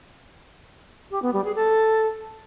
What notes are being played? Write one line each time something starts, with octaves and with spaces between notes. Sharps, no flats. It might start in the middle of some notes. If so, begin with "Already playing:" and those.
G4
B3
G3
G#4
A4